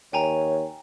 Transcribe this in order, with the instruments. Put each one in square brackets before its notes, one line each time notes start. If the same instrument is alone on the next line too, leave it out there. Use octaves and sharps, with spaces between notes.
[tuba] D#2 [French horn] C#5 [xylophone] G5 G#5 A#5